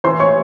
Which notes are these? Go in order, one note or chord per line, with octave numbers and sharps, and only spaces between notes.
E3 C5 C6
C#5 C#6